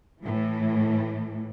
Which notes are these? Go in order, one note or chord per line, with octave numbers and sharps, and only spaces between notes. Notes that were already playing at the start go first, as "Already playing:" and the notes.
A2 E3